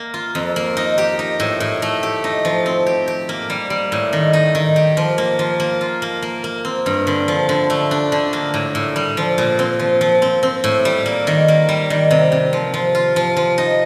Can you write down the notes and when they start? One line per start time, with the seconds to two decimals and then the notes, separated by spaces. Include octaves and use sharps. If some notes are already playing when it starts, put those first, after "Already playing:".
Already playing: A#3
0.14 F4
0.35 F2
0.56 A#3
0.77 D#4
0.98 G4
1.19 D#4
1.40 A2
1.60 A2
1.82 A3
2.03 G4
2.24 D#4
2.45 F3
2.66 C4
2.86 G4
3.08 G4
3.29 A#3
3.50 G3
3.70 G3
3.92 A2
4.13 D#3
4.33 D#4
4.55 D#3
4.76 G4
4.97 F3
5.18 A#3
5.39 F3
5.60 A#3
5.81 F4
6.02 A#3
6.23 A#3
6.44 A#3
6.65 C4
6.86 G2
7.07 D3
7.28 F3
7.49 D3
7.70 A3
7.91 D4
8.12 D3
8.33 A#3
8.54 A2
8.75 A2
8.96 G3
9.17 F3
9.38 A#2
9.59 C4
9.79 F3
10.01 F3
10.22 C4
10.43 C4
10.64 A2
10.85 G3
11.06 A#3
11.27 D#3
11.48 A#3
11.69 G3
11.90 D#3
12.11 C3
12.32 C3
12.53 F3
12.74 F3
12.95 F4
13.16 F3
13.37 F3
13.58 D#4